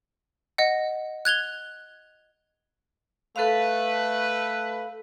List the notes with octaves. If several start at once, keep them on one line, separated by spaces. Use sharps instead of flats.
D#5 F#5
F#6 G#6 F7 G7
A3 A4 B4 F5